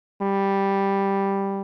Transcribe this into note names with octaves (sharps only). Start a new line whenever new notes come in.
G3